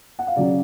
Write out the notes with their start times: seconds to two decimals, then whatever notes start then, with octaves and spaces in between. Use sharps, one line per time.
0.19 F#5
0.27 F5
0.36 C#3 F#3 C#4 D5